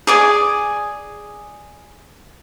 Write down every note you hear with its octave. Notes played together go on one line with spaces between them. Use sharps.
G#4 D5 G#5